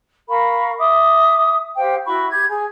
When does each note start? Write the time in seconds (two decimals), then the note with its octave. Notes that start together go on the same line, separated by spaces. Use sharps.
0.28 A#4 F5 B5 C#6
0.79 E5 D6 D#6
1.77 G4 C5 F5 G5
2.05 E4 F#4 B5 C#6
2.29 G4 G#6
2.47 G#4